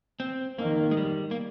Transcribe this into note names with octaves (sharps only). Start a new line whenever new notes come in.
C4
D#3 A#3
G#3
G3
A#3